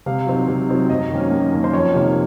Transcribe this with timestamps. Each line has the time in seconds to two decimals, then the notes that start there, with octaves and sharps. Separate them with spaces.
0.06 C3 F5
0.27 F#3 C4 D#4
0.48 C3
0.69 F#3 C4 D#4
0.89 F#2 D#5
1.10 D#3 A#3 C#4
1.31 F#2
1.52 D#3 A#3 C#4
1.64 C5
1.73 F2 C#5
1.94 C3 D#3 A#3 D#4